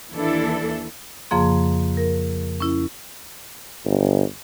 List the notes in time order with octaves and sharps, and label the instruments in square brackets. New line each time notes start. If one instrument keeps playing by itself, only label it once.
[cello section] D#2 E3 D4 E4 A4
[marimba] F2 C#3 F3 A#3 G#4 C6
A#4
C#4 E4
[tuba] G1